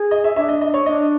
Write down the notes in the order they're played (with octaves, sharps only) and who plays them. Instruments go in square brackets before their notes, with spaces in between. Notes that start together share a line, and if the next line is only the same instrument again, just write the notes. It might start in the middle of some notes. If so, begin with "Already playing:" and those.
Already playing: [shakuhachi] G#4
[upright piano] D#5
E5
[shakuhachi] D4 [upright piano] E5
[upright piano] D#5
D#5
C#5
[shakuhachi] D4 [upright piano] D#5